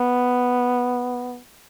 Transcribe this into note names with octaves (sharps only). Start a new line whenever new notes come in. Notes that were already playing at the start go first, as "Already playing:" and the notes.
Already playing: B3